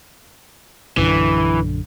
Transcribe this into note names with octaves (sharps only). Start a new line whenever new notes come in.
A#1 F#2 D3 E3